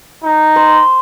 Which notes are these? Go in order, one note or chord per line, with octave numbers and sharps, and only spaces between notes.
D#4
C5